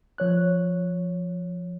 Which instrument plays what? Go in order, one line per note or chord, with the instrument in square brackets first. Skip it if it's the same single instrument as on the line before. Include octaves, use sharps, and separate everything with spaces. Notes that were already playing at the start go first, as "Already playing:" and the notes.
[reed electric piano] F3 C#5 F#6